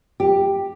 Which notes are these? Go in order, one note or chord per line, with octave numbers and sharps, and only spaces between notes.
G4